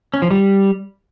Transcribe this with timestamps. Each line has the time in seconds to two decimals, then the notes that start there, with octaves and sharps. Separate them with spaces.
0.14 C#4
0.22 F3
0.31 G3